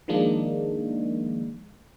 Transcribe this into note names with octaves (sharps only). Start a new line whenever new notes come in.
D#3 F3 G#3 A#3 D4 D#4